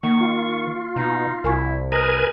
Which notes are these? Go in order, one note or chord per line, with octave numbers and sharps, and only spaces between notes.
D#3 A#3 C#6
F4
B2 D#4
C2 E4 A#4 G#5 C#6
A#4 B4 D#5 G#5 A#5